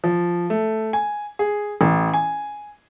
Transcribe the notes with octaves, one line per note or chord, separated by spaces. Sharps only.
F3
A3
G#5
G#4
A1
G#5